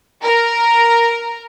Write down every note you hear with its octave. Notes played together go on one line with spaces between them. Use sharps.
A#4